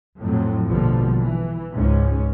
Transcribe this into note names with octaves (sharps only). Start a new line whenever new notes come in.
F2 A2 F#3 C4
A#1 B2 D3 F3 G3
E3
C#2 G#2 C#4